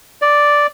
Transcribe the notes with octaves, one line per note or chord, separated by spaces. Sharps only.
D5